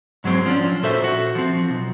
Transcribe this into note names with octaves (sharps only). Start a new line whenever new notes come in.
G#2 F#3 G#3 C4
F3 C#4 D4
A#2 F#4 A4 C5 E5
F#4
F3 C4
B1